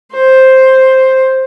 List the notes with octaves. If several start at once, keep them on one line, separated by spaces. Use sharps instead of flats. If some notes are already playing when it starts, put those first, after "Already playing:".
C5